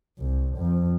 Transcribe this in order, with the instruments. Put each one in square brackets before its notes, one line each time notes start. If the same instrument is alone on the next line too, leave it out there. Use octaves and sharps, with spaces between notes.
[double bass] C2
F2